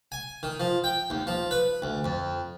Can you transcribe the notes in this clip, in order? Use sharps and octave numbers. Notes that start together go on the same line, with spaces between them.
G#5
D#3
F3
G5
D#2
F3
B4
D2
F2